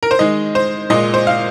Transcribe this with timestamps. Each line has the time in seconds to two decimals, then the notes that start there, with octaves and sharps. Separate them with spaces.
0.03 A#4
0.11 C5
0.19 D#3 G#3 D#5
0.55 C5
0.90 A#2 G#3 D#5
1.14 C5
1.27 F5